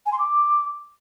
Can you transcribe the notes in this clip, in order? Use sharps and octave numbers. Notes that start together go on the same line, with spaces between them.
G#5
C6
D6